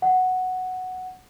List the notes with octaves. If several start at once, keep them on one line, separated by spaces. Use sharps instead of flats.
F#5